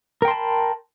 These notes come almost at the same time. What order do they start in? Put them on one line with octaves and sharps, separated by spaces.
A#4 G5 C6 A5 B5